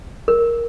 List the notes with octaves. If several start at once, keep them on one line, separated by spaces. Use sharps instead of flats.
A#4